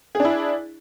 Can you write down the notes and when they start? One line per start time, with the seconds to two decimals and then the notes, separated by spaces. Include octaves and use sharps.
0.15 G#4
0.20 D4
0.25 E4